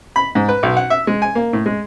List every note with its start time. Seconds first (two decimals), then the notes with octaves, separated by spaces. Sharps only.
0.16 B5
0.35 G#2
0.49 B4
0.63 B1
0.77 F#5
0.90 E5
1.07 G#3
1.22 G#5
1.35 A#3
1.53 A2
1.66 G#3